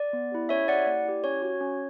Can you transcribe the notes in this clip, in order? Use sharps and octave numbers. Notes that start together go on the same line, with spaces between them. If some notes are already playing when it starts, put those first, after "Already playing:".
Already playing: D5
B3
E4 G4
C#4 C#5 E5
E4 G4 D5 F#5
A#3 D5
E4 G4
C#4 C#5
F#4
C#4